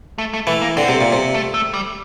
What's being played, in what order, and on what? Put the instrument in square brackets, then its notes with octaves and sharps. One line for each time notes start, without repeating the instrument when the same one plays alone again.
[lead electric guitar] A3
A3
[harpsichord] E3 [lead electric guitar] A3
[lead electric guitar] A#3
[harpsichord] D3 [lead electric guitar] C4
[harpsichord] C3
A#2
C3
[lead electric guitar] A3
A3
G3